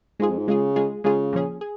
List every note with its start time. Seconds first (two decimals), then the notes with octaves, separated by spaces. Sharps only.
0.20 G#2 G#3 F4 G#4
0.29 F2
0.38 G#2
0.48 C#3 G#3 F4 G#4
0.76 G#3 F4 G#4
1.04 C#3 G#3 F4 G#4
1.33 A#2 F3 C#4 G#4
1.61 G#4